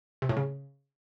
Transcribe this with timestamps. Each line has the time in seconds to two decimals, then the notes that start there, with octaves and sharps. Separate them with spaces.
0.22 C3
0.29 A2
0.37 C#3